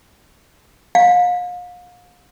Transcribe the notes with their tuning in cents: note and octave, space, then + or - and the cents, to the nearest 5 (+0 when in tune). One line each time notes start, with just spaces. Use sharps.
F5 +35